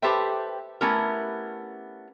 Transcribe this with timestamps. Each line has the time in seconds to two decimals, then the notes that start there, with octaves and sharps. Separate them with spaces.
0.02 G4 A4 B4 C5 E5 G5
0.81 A3 B3 C#4 E4 G4 A#4